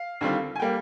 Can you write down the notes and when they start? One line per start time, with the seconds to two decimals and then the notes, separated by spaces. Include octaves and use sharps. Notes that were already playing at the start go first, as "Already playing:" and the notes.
Already playing: F5
0.21 D#2 D3 G3 C4 F4
0.56 G#5
0.60 G3 A#3 G5